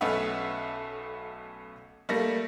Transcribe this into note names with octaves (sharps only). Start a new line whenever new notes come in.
B1 A3 C#4 B4 E5 F#5
G3 A3 A#3 A#6